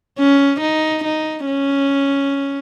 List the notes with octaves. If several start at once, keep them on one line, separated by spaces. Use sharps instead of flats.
C#4
D#4
D#4
C#4